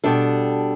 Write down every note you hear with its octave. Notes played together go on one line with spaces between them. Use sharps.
B2 G3 D4 A4